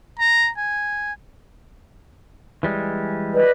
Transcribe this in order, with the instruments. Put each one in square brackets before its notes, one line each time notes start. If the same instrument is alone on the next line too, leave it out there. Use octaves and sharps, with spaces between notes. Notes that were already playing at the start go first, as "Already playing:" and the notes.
[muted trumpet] A#5
G#5
[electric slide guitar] E3 G3 G#3
[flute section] B4 D5 D#5